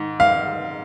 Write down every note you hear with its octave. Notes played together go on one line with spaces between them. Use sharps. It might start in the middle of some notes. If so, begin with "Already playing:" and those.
Already playing: G#2 D#3
F5